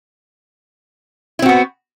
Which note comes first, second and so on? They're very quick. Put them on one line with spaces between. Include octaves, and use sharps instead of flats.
E4 C4 F#4 B3